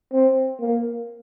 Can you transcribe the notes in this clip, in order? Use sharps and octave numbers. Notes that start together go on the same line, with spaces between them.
C4
A#3